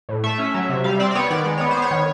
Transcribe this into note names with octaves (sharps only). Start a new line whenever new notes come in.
A2
A3 E5
C#4
F#3
C3
G3 F5
C4 D5
D5
B3 C#5
D#3 D5
G#3 D5
B3 C#5
C5
B3
C#5
D#3